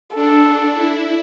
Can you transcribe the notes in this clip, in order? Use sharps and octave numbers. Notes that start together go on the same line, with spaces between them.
D4 A4
D4
E4